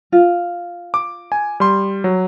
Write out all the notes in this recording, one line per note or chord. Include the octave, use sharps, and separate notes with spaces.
F4
D6
G#5
G3 C6
F#3